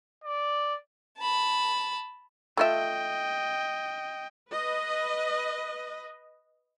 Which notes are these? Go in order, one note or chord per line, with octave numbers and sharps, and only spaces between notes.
D5
A5 B5
A3 F4 D#5 E5 G5
B4 D#5